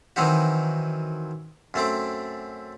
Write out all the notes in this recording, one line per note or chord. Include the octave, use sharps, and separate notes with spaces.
D#3 E3 F#3 C4 D#4 F#4
F#2 A3 C4 D6